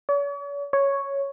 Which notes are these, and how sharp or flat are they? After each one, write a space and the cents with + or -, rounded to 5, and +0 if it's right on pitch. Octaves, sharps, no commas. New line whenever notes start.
C#5 +45
C#5 +0